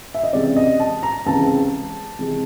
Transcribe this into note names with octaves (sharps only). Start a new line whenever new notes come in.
E5
D#5
C#2 C3 E3 G#3 C4 D5
D#5
A5
A#5
C#2 C3 E3 G#3 C4 A5
C3 E3 G#3